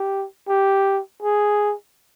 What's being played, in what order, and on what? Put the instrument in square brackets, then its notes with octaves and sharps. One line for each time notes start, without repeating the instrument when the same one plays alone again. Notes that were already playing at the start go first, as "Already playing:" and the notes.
Already playing: [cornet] G4
G4
G#4